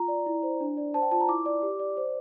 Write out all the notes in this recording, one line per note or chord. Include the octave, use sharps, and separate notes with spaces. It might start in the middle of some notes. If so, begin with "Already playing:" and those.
Already playing: F4 A#5
D5
E4
C5
D4
D5
C5 A5
G5
F4 A5
A#5
E4 D6
D5
G4
D5
C5